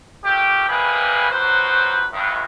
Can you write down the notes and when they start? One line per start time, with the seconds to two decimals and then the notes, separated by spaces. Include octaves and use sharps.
0.24 A#2 A3 G4
0.68 C3 G3 A#3 G#4 B4
1.30 C#2 F#3 B4 C5
2.13 A#1 G2